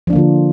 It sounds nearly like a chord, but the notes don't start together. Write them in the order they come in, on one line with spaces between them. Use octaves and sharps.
F3 D4 A#3 D3 F4